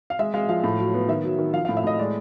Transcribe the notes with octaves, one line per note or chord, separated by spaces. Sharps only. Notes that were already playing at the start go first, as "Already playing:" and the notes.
F5
G#3 E5
G#3 F5
F3 F5
A2
F#3
B3
D#3 E5
F#3
D#3
F3 F5
A2 F5
E5
A2 D#5
G#3 D5